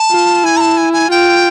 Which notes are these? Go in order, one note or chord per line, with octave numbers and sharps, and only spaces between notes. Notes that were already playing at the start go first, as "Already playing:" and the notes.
Already playing: A5
F4
E4 G#5
A#5
A5
G#5
G#5
F4 G5